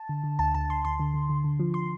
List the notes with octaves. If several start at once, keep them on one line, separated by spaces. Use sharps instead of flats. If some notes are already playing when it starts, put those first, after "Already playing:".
Already playing: A5
D3
D3
D2 A5
D2 A5
D2 C6
D2 C6
D3
D3
D3
D3
F3
C6